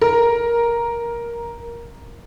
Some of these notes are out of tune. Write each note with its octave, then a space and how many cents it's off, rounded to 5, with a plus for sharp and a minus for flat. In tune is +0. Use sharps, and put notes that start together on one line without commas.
A#4 +10